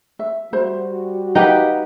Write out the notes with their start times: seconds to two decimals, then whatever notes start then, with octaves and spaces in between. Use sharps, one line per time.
0.19 E5
0.53 G3 F#4 C5 B5
1.35 D#4 G4 B4 F5 F#5 A#5